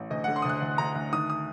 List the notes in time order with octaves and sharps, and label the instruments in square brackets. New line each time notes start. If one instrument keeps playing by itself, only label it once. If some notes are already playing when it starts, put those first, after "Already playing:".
Already playing: [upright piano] A1
D2 D#5
D3 F#5
C6
D#6
D2 F#6
D2
D2 A#5
D2
D#3 D#6
D#6